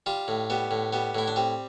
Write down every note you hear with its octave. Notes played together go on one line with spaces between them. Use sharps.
G3 F4
A2
G3 B3
A2
G3 B3
A2 E4
D4
G3 C4